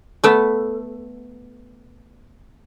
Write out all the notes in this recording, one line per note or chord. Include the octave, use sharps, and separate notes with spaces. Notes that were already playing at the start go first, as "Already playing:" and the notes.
A3 B3 A4